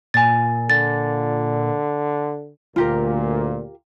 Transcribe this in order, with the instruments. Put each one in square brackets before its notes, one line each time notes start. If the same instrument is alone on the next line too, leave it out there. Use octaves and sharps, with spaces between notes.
[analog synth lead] A#2 [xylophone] G#5 A6
[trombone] D3 [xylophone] A6
[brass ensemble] D2 A#2 [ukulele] F4 G4 A#4